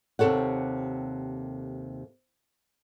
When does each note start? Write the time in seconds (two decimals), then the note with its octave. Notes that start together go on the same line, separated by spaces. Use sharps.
0.19 D#2 C3 F#3 A4 C#5 F#5